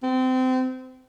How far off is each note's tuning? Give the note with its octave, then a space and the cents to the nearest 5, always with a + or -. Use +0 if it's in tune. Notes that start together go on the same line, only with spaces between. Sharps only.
C4 -25